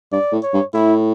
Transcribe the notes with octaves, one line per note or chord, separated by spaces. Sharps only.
G2 D5
A2
C#5
G2
A2 E4